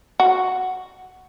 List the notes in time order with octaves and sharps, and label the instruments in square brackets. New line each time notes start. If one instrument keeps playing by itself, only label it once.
[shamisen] F#4